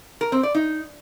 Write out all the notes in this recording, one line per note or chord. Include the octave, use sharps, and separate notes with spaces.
A#4
C4
D5
D#4